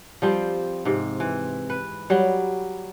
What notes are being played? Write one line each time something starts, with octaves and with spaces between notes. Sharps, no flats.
F3 G3 C4
G#2 C3
E3
B4
F#3 G3